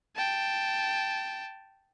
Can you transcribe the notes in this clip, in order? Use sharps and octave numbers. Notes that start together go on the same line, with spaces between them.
G5 A5